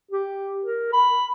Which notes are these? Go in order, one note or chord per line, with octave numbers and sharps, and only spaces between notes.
G4
A#4
B5